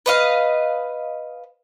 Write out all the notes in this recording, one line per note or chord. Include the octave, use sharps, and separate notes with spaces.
B4 D#5 F5